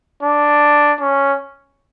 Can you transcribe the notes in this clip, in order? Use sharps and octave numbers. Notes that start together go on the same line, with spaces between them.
D4
C#4